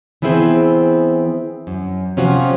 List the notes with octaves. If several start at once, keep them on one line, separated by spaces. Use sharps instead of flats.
E3 B3 C4 E4 G#4 C5
F#2
C3 F3 C#4 F4 F#4